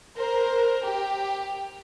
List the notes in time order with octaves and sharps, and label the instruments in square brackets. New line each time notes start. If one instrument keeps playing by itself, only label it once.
[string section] A#4 C5
G4